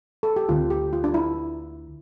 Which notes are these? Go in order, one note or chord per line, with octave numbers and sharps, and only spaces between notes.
A4
G4
D2 D3 A3 C4 F4
G4
F4
D4
E4